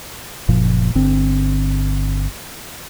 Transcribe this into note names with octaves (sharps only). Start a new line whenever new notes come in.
F#1 A#2 F3
G1 D3 C4